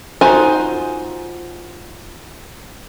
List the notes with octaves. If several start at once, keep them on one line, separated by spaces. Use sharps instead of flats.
D#4 F4 F#4 C5 G#5